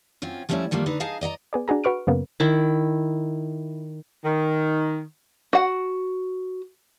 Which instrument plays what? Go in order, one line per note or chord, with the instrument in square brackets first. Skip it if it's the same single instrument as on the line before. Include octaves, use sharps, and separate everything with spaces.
[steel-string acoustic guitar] F#2 C4 C#4 F4
F3 G3 A3 C4 C#4 E4
D#3 F3 G3 A3 A#3
D3 D#4 B4
D#4 G#4 D#5 F5 A5
D5 D#5 F5 A#5
[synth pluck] B3 G#4 D5
D4 F#4 G#4 A#5
F#4 B4 C#6 F6 D7
F#2 C#3 A#3 B3
[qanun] D#3 E4
[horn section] D#3
[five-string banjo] F#4 F#5